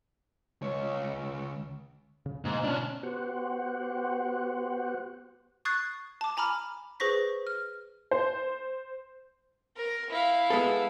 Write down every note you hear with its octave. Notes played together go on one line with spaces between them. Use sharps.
C#2 C#5
C#3
G#2 B2 D3 A#3
C#4 D4
B3 F#4 G4 C5 F#5
C#6 D#6 F#6 G#6 A6 C7
A5 D6
G#5 A#5 B5 D6 F6
G#4 B4 C5 C#6 A#6 B6
F6
C5
A#4
E4 F5
G#3 B3 A4